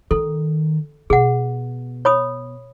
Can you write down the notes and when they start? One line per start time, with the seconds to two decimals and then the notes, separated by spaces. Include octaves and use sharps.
0.11 D#3 A4
1.10 B2 G#4 F#5
2.05 C#5 B5 D#6